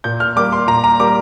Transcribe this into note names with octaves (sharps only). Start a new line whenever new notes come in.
A#2 G6
F6
G3 A#3 D6
C6
A#2 A#5
A#5
G3 A#3 D6